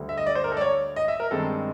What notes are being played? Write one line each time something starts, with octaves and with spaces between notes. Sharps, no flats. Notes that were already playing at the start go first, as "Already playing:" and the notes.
Already playing: D2 D3 G3
E5
D#5
D5
C5
A#4
A4
D5
C#5
D#5
E5
A#4
G2 D#3 G#3 C4 A4